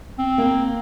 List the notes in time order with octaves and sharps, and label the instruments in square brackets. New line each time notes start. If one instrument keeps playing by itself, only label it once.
[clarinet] C4
[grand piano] A#3